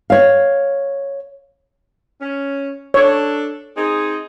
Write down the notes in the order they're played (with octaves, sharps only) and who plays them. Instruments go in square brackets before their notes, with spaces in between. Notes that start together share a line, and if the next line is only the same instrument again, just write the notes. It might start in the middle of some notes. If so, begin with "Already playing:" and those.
[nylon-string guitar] C#5 F5
[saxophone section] C#4
[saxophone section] D4 A4 [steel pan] C#5
[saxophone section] C4 D#4 G#4